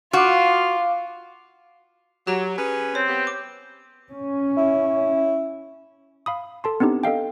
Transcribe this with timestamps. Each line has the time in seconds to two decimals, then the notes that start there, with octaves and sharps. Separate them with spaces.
0.13 F4 F#4 F5 D6
2.27 F#3 G4 A#5
2.58 C#4 G#4 B4
2.95 C4 C#5
3.08 B3 G4
3.27 D6
4.12 C#4
4.57 E4
6.26 F5 B5 D#6
6.64 A4 A5 C6
6.80 B3 C4 D4 D#4 G4
7.03 A4 D#5 F5 G5